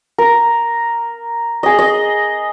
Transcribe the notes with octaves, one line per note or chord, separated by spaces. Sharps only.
A#4
G#4 D#5
D#5